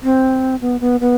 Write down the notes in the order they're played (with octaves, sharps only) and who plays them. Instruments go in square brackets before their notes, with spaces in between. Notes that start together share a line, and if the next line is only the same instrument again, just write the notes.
[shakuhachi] C4
B3
B3
B3